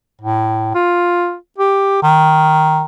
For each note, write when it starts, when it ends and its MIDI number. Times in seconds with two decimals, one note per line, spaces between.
0.21 0.72 45
0.75 1.35 65
1.58 2.00 67
2.02 2.85 51